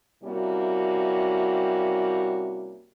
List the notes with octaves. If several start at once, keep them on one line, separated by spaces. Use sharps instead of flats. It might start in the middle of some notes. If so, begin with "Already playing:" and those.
C3 G3 A#3 C#4 E4 F#4